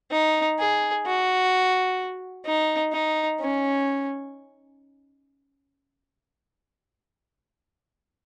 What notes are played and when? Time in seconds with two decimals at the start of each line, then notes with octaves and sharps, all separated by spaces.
0.11 D#4
0.59 G#4
1.06 F#4
2.45 D#4
2.92 D#4
3.40 C#4